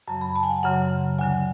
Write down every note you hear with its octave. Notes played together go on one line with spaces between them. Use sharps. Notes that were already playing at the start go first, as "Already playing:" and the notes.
F#2 C#3 F#3 A5
B5
A5
G#5
F#5
F#2 C#3 F#3 F#5
D2 D3 F#3 G#5